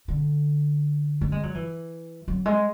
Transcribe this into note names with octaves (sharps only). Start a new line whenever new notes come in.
D3
A3
G#3
F#3
E3
F#3
G#3